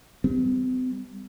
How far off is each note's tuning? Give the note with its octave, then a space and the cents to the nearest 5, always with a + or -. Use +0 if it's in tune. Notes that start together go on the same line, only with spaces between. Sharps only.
G3 +0 C4 -45